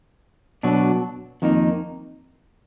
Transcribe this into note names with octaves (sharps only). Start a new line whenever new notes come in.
B2 F#3 D4
F2 D#3 A#3 D#4